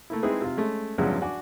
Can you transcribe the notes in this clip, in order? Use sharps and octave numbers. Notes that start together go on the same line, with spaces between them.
A3 A#3 E4
G#3 C4 D#4 E4 G#4 B4
C3 F4
G#3 A3 C#4
E2 G2 C#3 F3 F#3 G#3
D4 F#4 G#5 D6